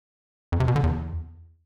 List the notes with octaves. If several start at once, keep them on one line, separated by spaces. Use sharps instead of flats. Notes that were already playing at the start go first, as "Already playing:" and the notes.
F2
C3
B2
D3
E2